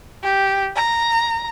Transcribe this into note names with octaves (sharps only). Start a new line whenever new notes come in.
G4
A#5